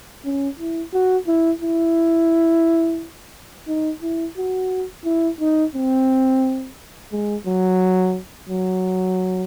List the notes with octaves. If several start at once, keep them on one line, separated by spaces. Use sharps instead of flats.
C#4
E4
F#4
E4
E4
D#4
E4
F#4
E4
D#4
C4
G#3
F#3
F#3